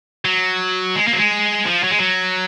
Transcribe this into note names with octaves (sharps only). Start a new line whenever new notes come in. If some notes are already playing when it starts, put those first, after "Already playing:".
F#3
G#3
A#3
F#3
G#3
F3
F#3
G#3
F#3